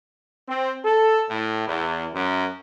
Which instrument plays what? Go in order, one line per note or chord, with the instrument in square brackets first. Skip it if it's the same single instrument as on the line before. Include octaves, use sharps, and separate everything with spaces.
[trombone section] C4
A4
A2
E2
F#2